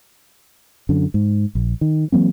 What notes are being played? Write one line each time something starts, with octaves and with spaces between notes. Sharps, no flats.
F#2 D3
G#2
A#1
D#3
E3 F#3 A#3 C4